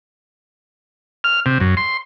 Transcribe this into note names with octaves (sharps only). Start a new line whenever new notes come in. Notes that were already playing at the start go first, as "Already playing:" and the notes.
F6
C3
F#2
C6